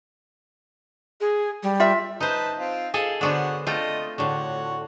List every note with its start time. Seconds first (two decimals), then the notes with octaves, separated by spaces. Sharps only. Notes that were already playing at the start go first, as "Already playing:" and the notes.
1.21 G#4
1.63 G3
1.80 F4 E5
2.20 D#4 B4 C5 A5
2.58 C4 F4
2.94 F4 G#4 A4 D#5
3.21 D3 B3 D4 F#4 C5 C#5
3.67 A3 C4 F4 D#5
4.18 A2 D3 F#4 C#5